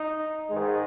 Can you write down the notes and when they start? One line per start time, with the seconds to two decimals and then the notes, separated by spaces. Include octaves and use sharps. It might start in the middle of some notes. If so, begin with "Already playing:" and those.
Already playing: D#4
0.50 G#2 D#3 G#3